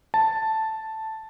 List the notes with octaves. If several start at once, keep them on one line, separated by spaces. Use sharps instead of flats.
A5